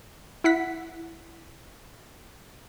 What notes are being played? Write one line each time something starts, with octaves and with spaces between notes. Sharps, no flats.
E4 F#5 B6